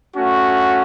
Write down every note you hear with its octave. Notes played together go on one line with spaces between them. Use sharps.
A3 C#4 F#4